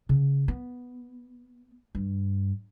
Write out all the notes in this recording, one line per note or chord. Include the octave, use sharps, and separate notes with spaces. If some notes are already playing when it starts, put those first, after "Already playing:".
C#3
B3
G2